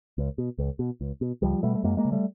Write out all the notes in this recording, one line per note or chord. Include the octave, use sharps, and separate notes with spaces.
C#2
B2
C#2
B2
C#2
B2
C#2 F3 G3
B2 G3 A3
A3
F#2 G#3 A#3
G#3 A#3
C#3
G3 A3